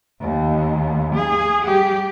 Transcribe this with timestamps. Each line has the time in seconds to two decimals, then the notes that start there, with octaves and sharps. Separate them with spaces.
0.21 D#2
1.15 G#4
1.65 G3 G4